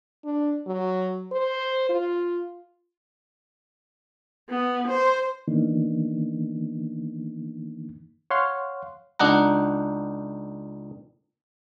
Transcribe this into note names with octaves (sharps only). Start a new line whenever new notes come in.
D4
F#3
C5
F4
B3
C5
D#3 E3 A#3 B3 D4 D#4
C#5 F5 F#5 C6
C#2 D4 D#4 F#5 A#5